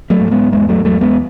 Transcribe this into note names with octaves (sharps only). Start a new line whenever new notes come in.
F#3 A3
G#2
G#3 B3
E2 G#3 B3
F#3 A3
E2 F#3 A3
G#3 B3